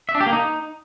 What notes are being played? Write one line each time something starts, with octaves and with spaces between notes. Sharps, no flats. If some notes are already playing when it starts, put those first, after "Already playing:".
E5
D4
G4
A#3
D#4